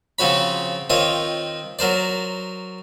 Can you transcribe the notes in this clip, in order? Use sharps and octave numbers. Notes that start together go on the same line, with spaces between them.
C#3 F3 C4 F#4 C#5 B5
D#3 C4 F4 C#5 D#5
F#3 A#4 C5 D5